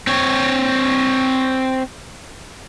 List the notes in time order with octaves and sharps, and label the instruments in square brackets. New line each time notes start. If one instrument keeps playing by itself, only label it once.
[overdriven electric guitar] C4 C#5